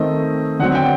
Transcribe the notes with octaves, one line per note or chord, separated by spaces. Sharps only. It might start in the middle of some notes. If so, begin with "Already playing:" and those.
Already playing: D#3 A3 C4 D#5
D3 F#3 C4 F#5
G5